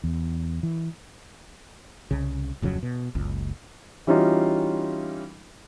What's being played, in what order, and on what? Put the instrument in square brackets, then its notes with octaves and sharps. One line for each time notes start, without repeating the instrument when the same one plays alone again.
[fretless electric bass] E2
E3
C2 C#3
D1 F2 C#3 F#3
B2
F#1 C#2
[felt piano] E3 G3 C#4 D#4 F4 F#4